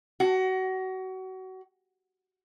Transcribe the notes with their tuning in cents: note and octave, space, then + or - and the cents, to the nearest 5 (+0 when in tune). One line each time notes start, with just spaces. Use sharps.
F#4 +25